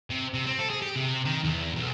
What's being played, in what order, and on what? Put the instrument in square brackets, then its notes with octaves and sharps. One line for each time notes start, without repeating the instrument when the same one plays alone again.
[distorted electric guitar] C3
C3
C4
A4
G#4
G4
C3
D#3
E2
B1